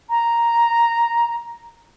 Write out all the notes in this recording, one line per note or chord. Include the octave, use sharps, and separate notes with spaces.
A#5